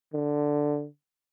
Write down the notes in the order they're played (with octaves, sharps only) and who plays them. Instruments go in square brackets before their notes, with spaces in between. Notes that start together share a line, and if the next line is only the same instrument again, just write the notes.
[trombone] D3